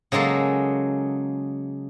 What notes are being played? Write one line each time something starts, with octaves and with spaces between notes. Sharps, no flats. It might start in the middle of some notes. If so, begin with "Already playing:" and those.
C#3 F#3 G#3 A#3 A4